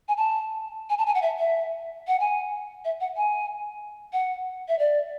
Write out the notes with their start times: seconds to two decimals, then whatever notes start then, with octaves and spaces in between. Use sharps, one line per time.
0.08 G#5
0.17 A5
0.90 G#5
0.98 A5
1.07 G#5
1.15 F#5
1.22 E5
1.39 E5
2.08 F#5
2.20 G#5
2.85 E5
3.01 F#5
3.17 G#5
4.13 F#5
4.68 E5
4.79 D5